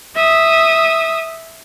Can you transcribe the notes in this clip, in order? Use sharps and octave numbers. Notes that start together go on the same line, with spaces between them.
E5 D#6